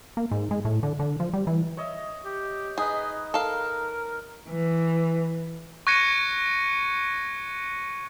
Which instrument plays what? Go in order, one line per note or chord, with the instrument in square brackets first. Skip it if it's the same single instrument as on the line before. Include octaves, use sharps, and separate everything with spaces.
[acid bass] A#3
G#2
G#3
A2
D3
D3
F3
G3
E3
[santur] C#5 D#5 E5
[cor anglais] G4
[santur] D#4 B4 [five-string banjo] G#4 [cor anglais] D#5
[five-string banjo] A4 F5 [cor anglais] A#4
[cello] E3
[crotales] C#6 F#6 G#6 A#6 C#7 D#7